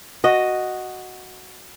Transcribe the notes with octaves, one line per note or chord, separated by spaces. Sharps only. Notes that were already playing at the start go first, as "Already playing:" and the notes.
F#4 D#5